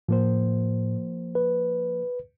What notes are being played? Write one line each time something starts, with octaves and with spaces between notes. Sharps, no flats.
A2 F3 A#3 C5
B4